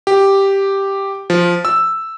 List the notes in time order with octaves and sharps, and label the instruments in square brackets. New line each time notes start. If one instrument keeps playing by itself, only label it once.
[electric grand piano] G4
F3
E6